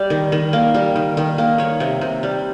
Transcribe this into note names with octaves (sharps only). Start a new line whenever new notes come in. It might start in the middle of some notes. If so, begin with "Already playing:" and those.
Already playing: G3 D5
D#3
D#3
A#3
G3
D#3
D#3
A#3
D#3 C#5
C3
C3
G3